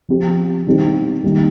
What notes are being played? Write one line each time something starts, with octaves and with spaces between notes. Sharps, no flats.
F3 C4 G4
D#3 G3 C4 D#4 G4
D#3 G3 A#3